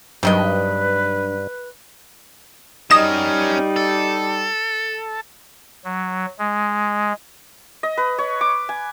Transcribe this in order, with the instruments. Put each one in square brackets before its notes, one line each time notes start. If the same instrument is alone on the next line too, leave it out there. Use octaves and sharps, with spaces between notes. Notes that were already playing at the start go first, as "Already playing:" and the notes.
[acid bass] G2 [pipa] C3 D#3 D#5 [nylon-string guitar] F#3 D4 G5 [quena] B4
[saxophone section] G3 D#4 [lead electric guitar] C#4 A#4 [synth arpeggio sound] D#5 E7
[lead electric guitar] A4
[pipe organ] F#3
G#3
[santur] D#5
B4
C#5
D6
G#5